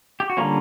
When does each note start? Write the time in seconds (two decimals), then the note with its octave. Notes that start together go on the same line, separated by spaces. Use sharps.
0.20 G4
0.30 F#4
0.37 D3 G3 A#3 C#4 F4